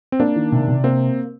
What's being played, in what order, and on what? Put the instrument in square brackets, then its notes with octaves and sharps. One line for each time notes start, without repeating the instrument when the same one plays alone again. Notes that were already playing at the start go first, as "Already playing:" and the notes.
[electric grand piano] C4
[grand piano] A#3 [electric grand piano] D4
[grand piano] D#3
C3
C3
[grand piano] A#3 [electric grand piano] C4